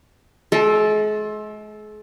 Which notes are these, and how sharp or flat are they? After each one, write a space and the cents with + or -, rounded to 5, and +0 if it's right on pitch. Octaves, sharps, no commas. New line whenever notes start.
G#3 +40 A4 -5